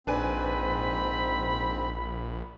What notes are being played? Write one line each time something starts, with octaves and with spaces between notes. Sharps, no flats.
A#1 G#2 C4 D4 B4 G#5 B5